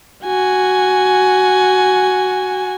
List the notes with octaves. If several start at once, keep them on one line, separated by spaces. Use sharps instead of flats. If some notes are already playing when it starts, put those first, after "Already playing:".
F#4 G#5